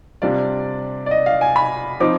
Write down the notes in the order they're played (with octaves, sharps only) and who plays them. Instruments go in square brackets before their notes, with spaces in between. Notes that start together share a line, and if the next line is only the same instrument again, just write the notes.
[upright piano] C3 G3 D4 F4 D5
D5
D#5
F5
G#5
B5
F3 C4 D#4 D6